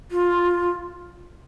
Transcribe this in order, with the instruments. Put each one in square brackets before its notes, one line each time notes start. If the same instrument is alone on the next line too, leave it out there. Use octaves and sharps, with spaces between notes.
[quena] F4